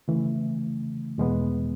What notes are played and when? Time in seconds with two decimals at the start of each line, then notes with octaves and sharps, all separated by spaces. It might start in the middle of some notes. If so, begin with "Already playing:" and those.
0.08 C#3 E3 A3
1.18 E2 B2 G#3 B3